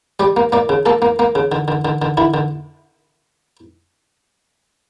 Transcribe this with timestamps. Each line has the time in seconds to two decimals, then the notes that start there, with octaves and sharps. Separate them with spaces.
0.20 G3 D5
0.37 A#3
0.52 A#3 D5
0.69 C#3
0.86 A#3 A4
1.02 A#3
1.19 A#3
1.35 C#3
1.52 D3
1.68 D3
1.85 D3
2.02 D3
2.17 D3 E4
2.34 D3